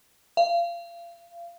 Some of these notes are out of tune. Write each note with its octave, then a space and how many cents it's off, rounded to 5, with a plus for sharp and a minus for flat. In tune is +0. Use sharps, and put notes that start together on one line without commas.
F5 -30